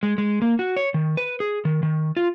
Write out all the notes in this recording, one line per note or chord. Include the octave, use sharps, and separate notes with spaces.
G#3
G#3
A#3
F#4
C#5
D#3
B4
G#4
D#3
D#3
F4